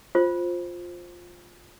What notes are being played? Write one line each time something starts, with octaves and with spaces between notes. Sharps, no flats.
F4 C5